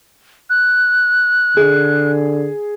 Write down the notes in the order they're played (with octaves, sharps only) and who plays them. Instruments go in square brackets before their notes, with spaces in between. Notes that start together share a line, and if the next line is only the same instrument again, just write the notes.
[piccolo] F#6
[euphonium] D3 [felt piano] G#4